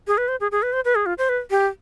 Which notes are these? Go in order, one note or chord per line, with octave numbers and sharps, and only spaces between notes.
G#4
B4
C5
G#4
G#4
B4
C5
B4
G#4
F4
C5
B4
G4